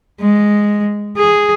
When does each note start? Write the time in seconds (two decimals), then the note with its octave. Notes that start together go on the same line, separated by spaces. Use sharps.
0.20 G#3
1.18 G#4